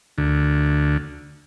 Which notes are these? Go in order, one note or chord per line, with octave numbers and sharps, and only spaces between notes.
D2